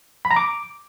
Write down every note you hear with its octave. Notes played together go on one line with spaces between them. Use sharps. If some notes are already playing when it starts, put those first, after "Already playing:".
B5
A#5
D6